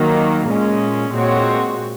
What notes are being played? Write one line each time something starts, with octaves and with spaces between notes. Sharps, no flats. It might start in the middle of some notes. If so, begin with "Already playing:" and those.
Already playing: D#3 F#3 A#3
A#2 G#3 C#4
A#2 G#3 C4 F#4 C#5